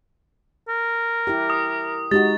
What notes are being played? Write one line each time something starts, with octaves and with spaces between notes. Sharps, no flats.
A#4
E4 G4
D#6
G#3 D#4 F#4 G4 A6